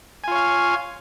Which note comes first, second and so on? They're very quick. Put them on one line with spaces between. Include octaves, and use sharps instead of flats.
G#5 F4 C#5 F5